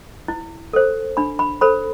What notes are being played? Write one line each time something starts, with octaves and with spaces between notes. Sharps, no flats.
E4
A4 C5
D4 B5
B5
A4 C5 B5